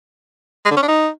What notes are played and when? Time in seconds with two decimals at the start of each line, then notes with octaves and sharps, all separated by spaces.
0.65 G#3
0.71 D3
0.77 C#4
0.83 D4
0.88 D#4